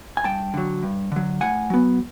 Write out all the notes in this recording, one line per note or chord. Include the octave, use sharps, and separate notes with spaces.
G#5
G2 G5 A5
D3 F#3
G2
D3 F#3
A2 F#5 G#5
F#3 B3